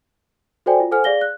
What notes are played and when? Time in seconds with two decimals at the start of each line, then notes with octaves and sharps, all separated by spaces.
0.66 F#4 A4 C5 D5 G5 G#5
0.80 F4
0.92 A4 C5 F#5 G#5 F6
1.04 G#4 D5 F5 A#6 G7
1.21 F#6